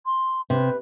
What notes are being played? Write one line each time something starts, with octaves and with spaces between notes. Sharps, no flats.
C6
C3 B4